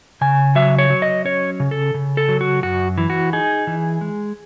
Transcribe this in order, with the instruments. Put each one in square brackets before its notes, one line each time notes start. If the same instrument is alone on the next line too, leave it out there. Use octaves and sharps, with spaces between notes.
[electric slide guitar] C#3 G#5
F#3 E5
C#5
F#3
D#5
C#4 C#5
C#3
A4
C#3
A4
F#3
F#4
F#2 F#4
E3
F#4
D#4 G#4
E3
G#3